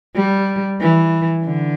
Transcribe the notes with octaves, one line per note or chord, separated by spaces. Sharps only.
G3
E3
D3